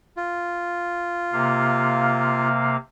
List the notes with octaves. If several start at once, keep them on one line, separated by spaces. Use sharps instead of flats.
F4
C3 A#3 F5